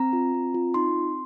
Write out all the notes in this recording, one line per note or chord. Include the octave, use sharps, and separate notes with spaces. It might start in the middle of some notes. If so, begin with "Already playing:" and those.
Already playing: C4 A#5
F4
C4
F4
D#4 C6
C4